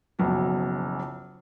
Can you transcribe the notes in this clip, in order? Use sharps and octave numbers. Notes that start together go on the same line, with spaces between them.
F#1 B1 F#2 F3 F#3